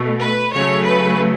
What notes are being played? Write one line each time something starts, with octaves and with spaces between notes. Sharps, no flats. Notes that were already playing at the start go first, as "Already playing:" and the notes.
Already playing: B2 A3
B4
C#3 F#3 A3 C#5
B4